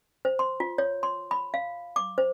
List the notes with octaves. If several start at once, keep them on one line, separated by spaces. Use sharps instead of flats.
C5
C6
F4
C#5
C6
B5
F5
D6
C5